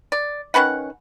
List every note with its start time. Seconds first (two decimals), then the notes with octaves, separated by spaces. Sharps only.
0.12 D5
0.54 D#3 C#4 B4 F#5